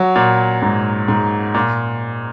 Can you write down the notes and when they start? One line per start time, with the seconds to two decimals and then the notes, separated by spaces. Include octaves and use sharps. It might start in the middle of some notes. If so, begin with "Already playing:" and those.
Already playing: F#3
0.15 A#2
0.62 G#2
1.08 G#2
1.54 A#2